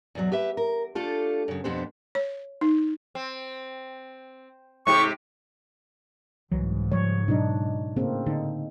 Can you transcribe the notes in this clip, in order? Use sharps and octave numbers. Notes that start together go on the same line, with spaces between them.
E2 B2 D#3 F#3
G4 B4 E5
A#4
A3 D4 F4 G4 A4
F#2 C#3
F2 B2 B3 D4 G4 C5
C#5
D#4
C4
G#2 C3 G4 C#6
C2 G#2 C#3 E3 F#3
F3 G3 C#5
B2 F#3 D4 D#4
A2 C#3 A#3 C4
D3 D#4